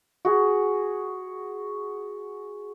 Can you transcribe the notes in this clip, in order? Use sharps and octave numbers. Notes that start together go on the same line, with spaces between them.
F#4 G#4